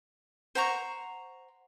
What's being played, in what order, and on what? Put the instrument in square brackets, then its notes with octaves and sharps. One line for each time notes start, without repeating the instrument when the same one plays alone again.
[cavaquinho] C5 F#5 A#5 C#6